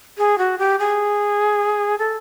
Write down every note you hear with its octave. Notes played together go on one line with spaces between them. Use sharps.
G#4
F#4
G4
G#4
A4